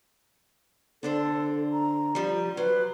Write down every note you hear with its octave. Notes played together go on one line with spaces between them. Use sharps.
D3 D4 A4 C5
A#5
F3 G3
F#3 B4 C5